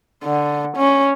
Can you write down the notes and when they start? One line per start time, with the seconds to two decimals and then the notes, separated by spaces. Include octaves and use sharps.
0.24 D3
0.77 C#4